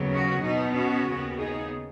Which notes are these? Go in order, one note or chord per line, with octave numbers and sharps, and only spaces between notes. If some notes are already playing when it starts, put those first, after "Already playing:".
Already playing: D#2 C#3 F#3 B3
C#4 F#4
B2 B3 D#4
C#4 F#4
D#2 C#3 B3
D#4 G#4